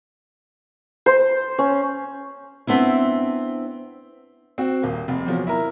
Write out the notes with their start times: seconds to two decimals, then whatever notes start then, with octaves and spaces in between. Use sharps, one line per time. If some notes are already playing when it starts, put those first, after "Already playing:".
1.06 C5
1.58 C#4
2.67 B3 C4 D4 E4
4.58 C4 F#4
4.82 D#1 A#3
5.08 F1
5.26 E2 F3 F#3
5.47 E4 A#4